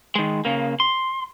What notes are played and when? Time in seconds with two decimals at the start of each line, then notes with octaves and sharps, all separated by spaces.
0.15 D#3 G#3
0.45 C#3 A#3
0.80 C6